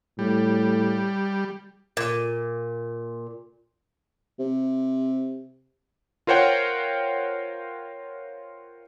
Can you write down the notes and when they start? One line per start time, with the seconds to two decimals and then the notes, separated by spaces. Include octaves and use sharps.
0.19 A2 G3
1.97 A#2
4.39 C3
6.27 F4 A#4 C5 C#5 F#5 G5